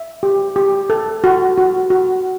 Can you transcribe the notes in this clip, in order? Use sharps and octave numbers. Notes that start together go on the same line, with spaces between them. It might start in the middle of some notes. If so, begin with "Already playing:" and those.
Already playing: E5
G4
G4
A4
F#4
F#4
F#4